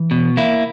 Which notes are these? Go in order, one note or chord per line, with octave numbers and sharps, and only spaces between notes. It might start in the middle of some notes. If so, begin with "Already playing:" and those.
Already playing: E3
B2
A#3 E4